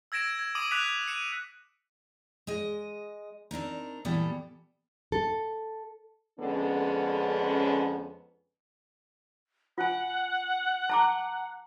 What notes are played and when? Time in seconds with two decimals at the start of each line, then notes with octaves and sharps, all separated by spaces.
0.12 E6 G#6 A#6 D7 E7
0.39 G#6
0.55 D6 D#6 D#7 F#7
0.71 D6 F#6 B6 E7 F7
1.08 C#7 D#7 E7
2.47 G#3 D#5
3.51 C4 D4 D#4 A#4
4.05 A#2 E3 G3 B3 A4
5.12 A4
6.39 F2 D3 G#3 B3 C#4
9.78 F4 F#5 G#5
10.90 A5 A#5 D6